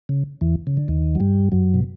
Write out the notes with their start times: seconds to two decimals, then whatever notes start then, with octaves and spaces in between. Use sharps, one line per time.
0.09 C#3
0.41 E2 E3
0.67 C#3
0.77 D3
0.88 D#2 D#3
1.15 F#3
1.20 G2 G3
1.52 F#2 F#3
1.74 B2